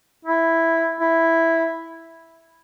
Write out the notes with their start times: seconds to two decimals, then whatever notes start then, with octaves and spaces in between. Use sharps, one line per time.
0.25 E4
1.00 E4